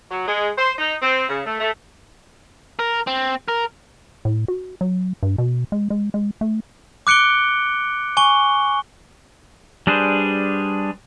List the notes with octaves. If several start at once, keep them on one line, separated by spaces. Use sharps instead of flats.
F#3
G#3
C5
D#4
C4
C#3
A3
A3
A#4
C4
A#4
A2
F#4
F#3
G2
B2
G#3
G#3
G#3
A3
D6 F#6 C#7 D7 G7
G#5 C#6 G7
G3 D4 G#4 B4 C5